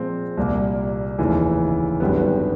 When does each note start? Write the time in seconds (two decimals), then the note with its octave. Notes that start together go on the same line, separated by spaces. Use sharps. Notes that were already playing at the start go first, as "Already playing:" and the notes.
Already playing: A#2 F3 G#3 C4
0.37 C2 A#2 G3 A#3
1.19 F1 D#2 C#3 E3
2.00 G#1 F#2 D3 G3 B3